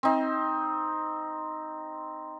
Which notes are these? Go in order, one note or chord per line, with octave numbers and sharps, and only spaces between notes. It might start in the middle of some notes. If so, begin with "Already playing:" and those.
C4 D#4